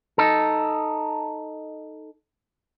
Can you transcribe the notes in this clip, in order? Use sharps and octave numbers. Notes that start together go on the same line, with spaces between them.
D#4 A4